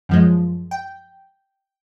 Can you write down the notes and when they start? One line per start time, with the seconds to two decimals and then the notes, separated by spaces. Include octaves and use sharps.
0.09 F#2 F3 G#3
0.71 G5